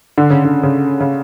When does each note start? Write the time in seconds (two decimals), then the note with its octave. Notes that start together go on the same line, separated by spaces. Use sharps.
0.18 D3
0.30 C#3
0.45 D3
0.63 C#3
1.00 C#3